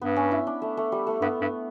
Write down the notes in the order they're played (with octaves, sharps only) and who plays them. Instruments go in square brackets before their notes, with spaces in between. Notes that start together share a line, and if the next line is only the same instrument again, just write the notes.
[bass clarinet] G2 [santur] B3
[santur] C#4
E4
D4
A3
A3
G3
A3
[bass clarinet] G2 [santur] B3
[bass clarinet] G2